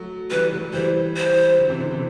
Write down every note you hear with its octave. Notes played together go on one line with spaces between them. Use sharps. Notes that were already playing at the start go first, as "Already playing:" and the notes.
Already playing: F#3 A3
E3 G3 B4
F#3 A3
E3 G3 C5
E3 G3 C5
D3 F#3
C3 E3
B2 D3
C3 E3